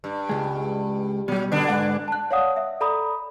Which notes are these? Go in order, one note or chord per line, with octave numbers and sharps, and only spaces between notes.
G2
C#2 G#3
B2 F#3 G3
D3 B3 D4
G#2 G#3 F#5
A5 F#6
C#5 D5 F5 F#5 D#6
E5
A4 D5 A#5 B5 D#6